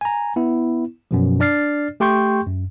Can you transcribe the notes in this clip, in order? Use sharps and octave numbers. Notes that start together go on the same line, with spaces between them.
G#5 A#5
B3 E4
F#2 B2 F3
D4 D5 F6 A6 C7
A3 G4 G5 C6 C#6 G6
F#2